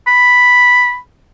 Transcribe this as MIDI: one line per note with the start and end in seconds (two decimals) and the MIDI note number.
0.07 0.98 83